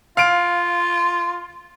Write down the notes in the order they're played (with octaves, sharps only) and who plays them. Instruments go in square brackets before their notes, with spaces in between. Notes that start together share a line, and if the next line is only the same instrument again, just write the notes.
[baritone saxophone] F4 [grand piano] F5 C7 D7